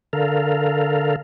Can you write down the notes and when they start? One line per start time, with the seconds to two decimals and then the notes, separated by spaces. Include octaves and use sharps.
0.13 D3 A4 A#4 F5